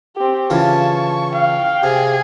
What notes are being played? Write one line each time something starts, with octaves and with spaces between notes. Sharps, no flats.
C4 G4
C#3 E3 F4 A5 C#6
F5 G5
C3 G#4